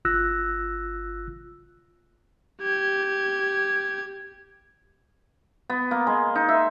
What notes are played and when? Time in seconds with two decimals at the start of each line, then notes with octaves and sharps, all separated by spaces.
0.05 G1 F4 E6 F#6 A#6
2.61 G4 G#6
5.70 B3
5.91 A#3
6.07 G#3
6.35 D#4
6.49 E5